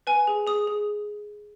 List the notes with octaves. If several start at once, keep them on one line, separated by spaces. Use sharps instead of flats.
B4 G#5
G#4
G#4 D#6
G#4